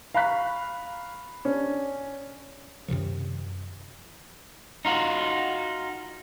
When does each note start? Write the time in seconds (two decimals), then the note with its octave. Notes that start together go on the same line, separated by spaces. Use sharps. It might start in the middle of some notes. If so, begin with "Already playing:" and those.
0.14 F5 A#5 B5 C#6 F#6 B6
1.45 C#4 D4
2.88 F#2 C3 D#3 F3
4.85 D#4 F4 F#4